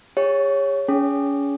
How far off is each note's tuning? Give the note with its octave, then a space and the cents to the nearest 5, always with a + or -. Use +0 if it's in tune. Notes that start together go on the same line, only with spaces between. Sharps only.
G#4 -45 C#5 +0
C#4 +30 G#4 +0